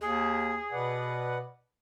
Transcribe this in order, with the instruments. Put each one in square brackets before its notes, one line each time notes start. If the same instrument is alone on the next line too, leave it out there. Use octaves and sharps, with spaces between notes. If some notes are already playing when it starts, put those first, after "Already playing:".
[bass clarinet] D#2 [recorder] G#4
[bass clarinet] B2 [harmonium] B4 D5 F#5